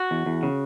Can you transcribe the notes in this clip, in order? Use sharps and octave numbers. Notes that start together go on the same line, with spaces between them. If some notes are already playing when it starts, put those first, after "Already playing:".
Already playing: F#4
E2
E2
C#3